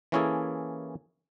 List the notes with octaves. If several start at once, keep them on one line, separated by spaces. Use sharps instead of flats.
E3 A#3 C#4 E4 G#4 A4